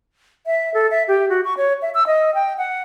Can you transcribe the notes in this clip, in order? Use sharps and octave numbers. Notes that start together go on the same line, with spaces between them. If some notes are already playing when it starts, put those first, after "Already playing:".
E5
A4
E5
G4
F#4
C#6
C#5
E5
E6
D#5
G5
F#5